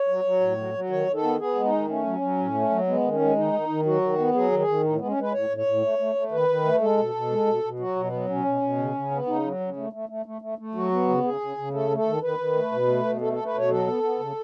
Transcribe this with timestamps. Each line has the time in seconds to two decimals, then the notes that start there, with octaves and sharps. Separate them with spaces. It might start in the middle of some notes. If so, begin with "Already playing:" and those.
Already playing: C#5
0.08 F#3
0.24 F#3
0.40 A2
0.57 F#3
0.74 F#3
0.90 D#3 C#5
1.07 D#3
1.14 A4
1.23 B3
1.39 B3 G#4
1.56 G#3
1.64 D#4
1.72 D#3
1.89 A3 C#4
2.05 F#3
2.21 F#3
2.38 A2
2.54 A3
2.70 F#3
2.87 G#3 B3
3.03 D#3
3.12 C#4
3.20 G#3
3.36 D#3 D#4
3.53 D#3
3.69 D#3
3.86 F#3 F#4
4.01 D#3
4.18 B3
4.34 F#3 G#4
4.52 D#3
4.59 G#4
4.68 D#3
4.83 A2 D#4
4.97 G#3 B3
5.08 C#4
5.17 G#3 B4
5.33 A2 C#5
5.50 A2
5.57 C#5
5.66 A2
5.82 A3
5.99 A3
6.15 A3
6.31 D#3 B4
6.48 D#3
6.64 A3
6.81 G#3 A4
6.97 B2
7.14 B2
7.30 G#3
7.46 B2
7.63 B2
7.79 F#3 F#4
7.96 B2
8.04 B3
8.12 F#3
8.29 B2 C#4
8.45 B2
8.61 B2
8.78 C#3
8.94 C#3
9.11 B3
9.27 C#3 D#4
9.44 F#3
9.60 C#3
9.76 A3
9.93 A3
10.09 A3
10.26 A3
10.42 A3
10.58 A3
10.75 F#3 F#4
10.91 B3
11.08 C#3
11.24 C#3 G#4
11.41 C#3
11.57 C#3
11.73 A3 A4
11.90 A3
11.97 A4
12.06 D#3
12.22 D#3 B4
12.39 D#3
12.55 A3
12.72 B2
12.88 A3
13.05 B2
13.21 A3 A4
13.33 A3 A4
13.46 B4
13.54 B2 C#5
13.70 F#3 A4
13.87 B3
14.03 B3
14.19 C#3